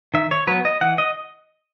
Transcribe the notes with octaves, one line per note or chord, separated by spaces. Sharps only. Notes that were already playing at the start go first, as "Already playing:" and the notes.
D#3 E5
C#5
F#3 B3 B4
D#5
E3 F#5
D#5